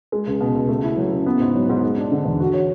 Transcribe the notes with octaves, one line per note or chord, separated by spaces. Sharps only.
G#3
C#2
B2
C#2
A3
E4
F#3
C#3
B3
G#2
F#3
G#2
G#3
D4
D3
E2
F#4
C#5